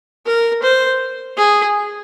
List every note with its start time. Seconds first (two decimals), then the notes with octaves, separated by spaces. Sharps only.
0.27 A#4
0.63 C5
1.38 G#4